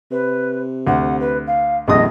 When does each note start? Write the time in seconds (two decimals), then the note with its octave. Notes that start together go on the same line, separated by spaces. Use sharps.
0.11 C3 B4
0.87 D2 F#5
1.20 B4
1.47 F5
1.88 D#1 A#1 F2 D#5 D#6